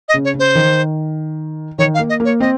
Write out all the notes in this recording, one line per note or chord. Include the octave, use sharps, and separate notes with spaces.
D#5
C#3
C#5
C#3
C5
D#3
D#3 C#5
F5
A#3
D#5
A#3 C#5
C4 D#5